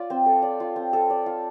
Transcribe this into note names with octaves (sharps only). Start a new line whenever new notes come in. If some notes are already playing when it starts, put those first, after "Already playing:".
Already playing: F4 D5
C4
A4
D5
F4
C4
A4
D5
F4